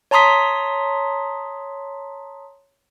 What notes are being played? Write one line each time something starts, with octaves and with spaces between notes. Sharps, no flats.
C#5 A5 A#5 C6 D#6 B6